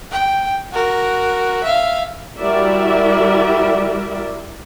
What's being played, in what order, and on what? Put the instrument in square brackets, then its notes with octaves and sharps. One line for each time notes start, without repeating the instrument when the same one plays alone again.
[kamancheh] G5
F#4 A#4
E5 F5
[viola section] G3 E4 F#4 A#4 D5 E5